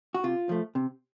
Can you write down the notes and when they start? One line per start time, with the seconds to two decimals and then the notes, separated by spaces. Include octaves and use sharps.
0.14 F#4
0.24 C3 F4
0.49 F3 A3
0.75 C3